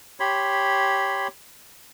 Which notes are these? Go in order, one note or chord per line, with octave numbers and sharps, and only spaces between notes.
G4 C#5 B5 C6